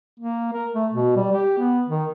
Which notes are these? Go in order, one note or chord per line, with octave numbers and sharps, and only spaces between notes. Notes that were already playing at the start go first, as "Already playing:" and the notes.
A#3
A#4
A3
B2
G3
G4
B3
D#3